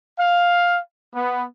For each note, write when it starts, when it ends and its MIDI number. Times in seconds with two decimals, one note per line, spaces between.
0.19 0.76 77
1.13 1.43 59